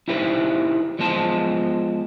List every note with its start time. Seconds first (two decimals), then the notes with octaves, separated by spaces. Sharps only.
0.08 D#4 E4 G4 B4 C5
0.99 F3 G#3 B3 C5 A5